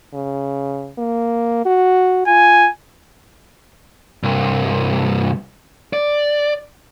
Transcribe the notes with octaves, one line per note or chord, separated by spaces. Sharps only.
C#3
A#3
F#4
F4 G#5
C2 G2
D5